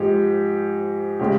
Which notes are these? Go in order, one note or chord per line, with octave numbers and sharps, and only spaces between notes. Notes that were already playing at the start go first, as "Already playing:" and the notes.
Already playing: G#2 F3 G#3 G4
C#3 G#3 G4